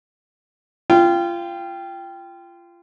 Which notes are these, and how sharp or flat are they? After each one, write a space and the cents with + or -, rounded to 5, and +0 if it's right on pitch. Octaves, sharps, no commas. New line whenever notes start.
F4 -25 G5 +0